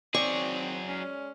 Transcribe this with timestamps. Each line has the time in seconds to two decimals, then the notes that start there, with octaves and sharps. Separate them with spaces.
0.14 D#3 F#3 C4 G#4 D5 C#6
0.88 G#3 C#4